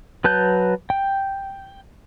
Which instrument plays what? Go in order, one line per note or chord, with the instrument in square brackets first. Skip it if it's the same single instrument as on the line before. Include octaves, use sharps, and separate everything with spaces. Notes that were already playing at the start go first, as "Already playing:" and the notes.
[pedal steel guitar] F#3 B4 A5 F#6 G6
G5